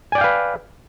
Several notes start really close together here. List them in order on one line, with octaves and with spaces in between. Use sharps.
G#5 D5 G5 F5 B4